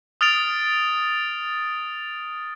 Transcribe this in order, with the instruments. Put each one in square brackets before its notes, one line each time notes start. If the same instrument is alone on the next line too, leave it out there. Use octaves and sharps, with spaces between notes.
[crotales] D#6 F6 A6 D7 F7